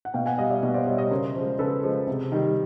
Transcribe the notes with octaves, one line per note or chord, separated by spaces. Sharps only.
F#5
B2 F5 G5
F#5 G#5
G3 D#5 F5
D5 E5
B2
C5 D5
G3 C#5 D#5
E5
C#5 D#5
C#3 A#4 C5
F3 G#3
C#3 A4 B4
F3 G#3
C3
D#3 G3